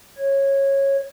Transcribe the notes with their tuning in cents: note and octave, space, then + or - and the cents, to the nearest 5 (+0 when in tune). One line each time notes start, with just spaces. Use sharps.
C#5 -15